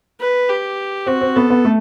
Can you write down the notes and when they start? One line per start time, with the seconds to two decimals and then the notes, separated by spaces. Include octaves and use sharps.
0.20 B4
0.49 G4
1.06 C4 F#4
1.21 C4
1.36 B3 A4
1.50 B3
1.65 A3